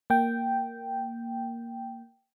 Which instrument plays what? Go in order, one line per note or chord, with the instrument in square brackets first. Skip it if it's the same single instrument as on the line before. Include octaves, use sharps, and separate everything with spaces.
[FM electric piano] A#3 G5